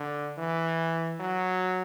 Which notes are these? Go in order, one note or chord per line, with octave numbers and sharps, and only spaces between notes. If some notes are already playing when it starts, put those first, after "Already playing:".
Already playing: D3
E3
F#3